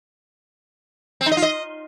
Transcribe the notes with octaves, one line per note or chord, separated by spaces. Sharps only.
C4
D#4
D#5
F4
D#5